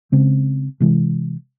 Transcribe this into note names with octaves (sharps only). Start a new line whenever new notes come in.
C#3 G#3 C4
C3 E3 G#3